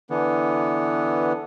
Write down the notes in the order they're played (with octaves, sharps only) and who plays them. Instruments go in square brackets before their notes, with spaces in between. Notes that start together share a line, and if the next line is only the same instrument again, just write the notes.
[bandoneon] D3 E3 B3